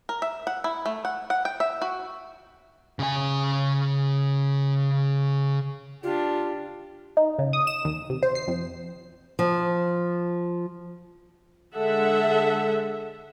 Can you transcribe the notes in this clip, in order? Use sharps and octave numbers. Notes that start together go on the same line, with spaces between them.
A#4
E5
F#5
E4
A3
F#5
F#5
G5
E5
F#4
C#3 G#5
D4 F4 G4
D#4
C#3
D#6
E7
D#2
C3
C5
C7
F2
F3
D3 G#3 A4 E5 F#5